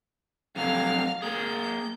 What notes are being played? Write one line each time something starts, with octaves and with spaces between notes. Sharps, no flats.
F2 C3 F#3 F5 F6
A#3 G#4 G6